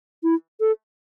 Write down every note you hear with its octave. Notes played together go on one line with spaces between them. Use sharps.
E4
A4